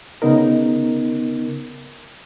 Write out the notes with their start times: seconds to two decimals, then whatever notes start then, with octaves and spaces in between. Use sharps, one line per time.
0.22 C#3 B3 D#4 A#4